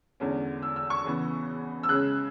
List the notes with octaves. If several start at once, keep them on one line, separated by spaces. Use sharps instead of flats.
E2 D3 G#3 C#4
E6
E6
C#6
C#3 E3 B3
E6
C#3 G#3 C#4 F#6